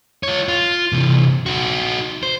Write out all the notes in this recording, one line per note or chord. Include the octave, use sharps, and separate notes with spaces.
F4 C#5
F4
C3 E3
D#4 F#4
C5